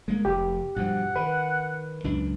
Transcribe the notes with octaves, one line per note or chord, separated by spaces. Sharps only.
G#3 A#3
F1 G4
G2 B2 F3 F#5
D#3 B4
C#2 F#2 D4